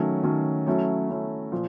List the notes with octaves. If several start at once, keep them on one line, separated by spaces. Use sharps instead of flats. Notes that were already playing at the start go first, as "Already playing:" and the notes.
Already playing: D#3 F#3 A3 C#4
D#3 F#3 A3 C#4
F#3 A3 C#4 E4
F#3 A3 C#4 E4
A#2 F3